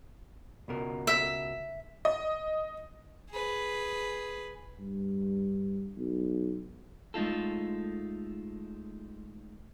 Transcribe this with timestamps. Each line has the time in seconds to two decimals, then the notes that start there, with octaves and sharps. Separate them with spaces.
0.68 C#2 B2 A#4
1.07 E5
2.05 D#5
3.30 G#4 B4
4.80 G2
5.97 B1
7.14 G#3 A3 D#4 F4 A4